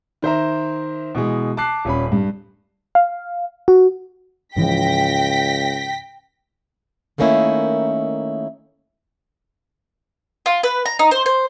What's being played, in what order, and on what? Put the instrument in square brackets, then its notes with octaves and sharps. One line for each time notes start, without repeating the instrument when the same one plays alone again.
[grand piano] D#3 C5 E5 A#5
B2 E3 G#3
A5 D6 F#6 C7
D#1 C#4 B5
G2
[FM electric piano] F5
F#4
[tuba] C#2 [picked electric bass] G#2 E3 F3 [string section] G5 A#6 B6
[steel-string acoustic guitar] D#3 A3 A#3 C#4 D#4 E4
[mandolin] F4
B4
A#5
D#4
C5
C5